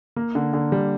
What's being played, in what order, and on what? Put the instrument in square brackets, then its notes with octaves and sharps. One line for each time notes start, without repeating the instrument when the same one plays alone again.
[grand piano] A#3
D3
D3
G3